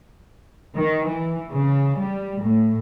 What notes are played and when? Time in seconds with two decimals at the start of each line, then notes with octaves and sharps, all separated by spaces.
0.75 D#3
1.07 E3
1.50 C#3
1.98 G3
2.41 A2